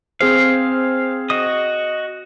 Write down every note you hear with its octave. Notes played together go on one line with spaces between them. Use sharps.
C4 G#4 C5 F5
F#4 D#5 D#6